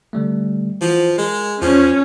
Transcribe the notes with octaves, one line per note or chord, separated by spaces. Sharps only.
D3 G3 A3
E3 F3 F#4 C5
G#3 A#4
E2 F3 C#4